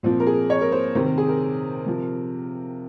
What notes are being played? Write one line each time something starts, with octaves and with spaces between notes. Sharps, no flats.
A#2 F3 C4
A#4
G#4
C#5
A#4
C5
C3 D#3 C5
A#4
G#4
A#4
C3 F3